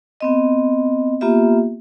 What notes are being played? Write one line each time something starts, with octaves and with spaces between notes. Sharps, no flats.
B3 C4 D#5
A#3 B3 F4 G4 E5